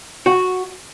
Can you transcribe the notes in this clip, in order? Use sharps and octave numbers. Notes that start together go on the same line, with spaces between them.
F#4